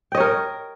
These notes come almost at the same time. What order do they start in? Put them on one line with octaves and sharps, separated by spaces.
G5 D#5 C#5 A#4